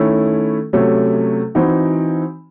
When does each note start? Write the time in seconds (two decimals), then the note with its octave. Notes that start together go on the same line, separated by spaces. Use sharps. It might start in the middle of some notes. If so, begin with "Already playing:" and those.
Already playing: D#3 A3 C#4 E4
0.73 C3 F#3 A3 C#4
1.55 E3 C4 D#4 F#4